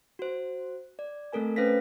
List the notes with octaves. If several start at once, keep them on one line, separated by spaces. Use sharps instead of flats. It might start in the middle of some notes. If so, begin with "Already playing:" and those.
F#4 C5
D5
A3 C4 A4 A#4 G#5
C#4 B4 C5 F5 A#6 B6